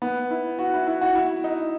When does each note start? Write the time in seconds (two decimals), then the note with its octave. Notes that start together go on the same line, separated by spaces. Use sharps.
0.02 B3
0.30 E4
0.59 F#4
0.74 E4
0.87 E4
1.01 F#4
1.15 E4
1.44 D#4